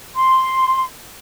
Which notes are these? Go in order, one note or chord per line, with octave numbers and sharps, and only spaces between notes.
C6